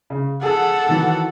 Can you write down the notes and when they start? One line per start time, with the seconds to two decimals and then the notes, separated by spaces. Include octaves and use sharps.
0.10 C#3
0.43 G#4 A4 F#5
0.89 D#3 E3 F#3